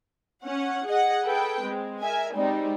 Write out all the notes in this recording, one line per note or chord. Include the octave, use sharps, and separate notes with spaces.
C#4 F#5
G#4 D#5 F#5
G#4 A4 B4 G5
G#3 C4
A#4 E5 G#5
G3 G#3 C4 D#4